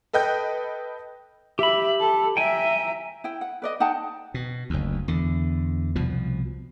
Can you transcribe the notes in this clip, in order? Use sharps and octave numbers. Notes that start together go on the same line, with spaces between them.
A4 B4 D#5 G5 G6
G4 E5 B5
A4
E5 G5 G#5 A#5
E4 G5
F#5
B4 D5 D#5
D#4 F#5 G5 A5
B2
F#1 D2
E2 D3
C2 B2 F3